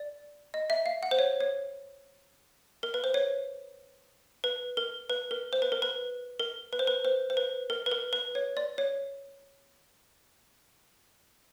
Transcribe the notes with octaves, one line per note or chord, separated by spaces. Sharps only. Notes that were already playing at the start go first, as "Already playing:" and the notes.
Already playing: D5
D#5
E5
F5
F#5
C5
C#5
C#5
A#4
B4
C5
C#5
B4
A#4
B4
A#4
C5
B4
A#4
B4
A#4
B4
C5
B4
C5
C5
B4
A#4
B4
A#4
B4
C#5
D5
C#5